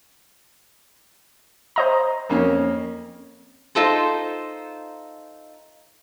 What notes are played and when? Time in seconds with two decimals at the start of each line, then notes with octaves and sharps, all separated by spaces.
1.76 C5 D#5 A#5
2.29 F2 A#3 C#4
3.75 D#4 F4 A4 C5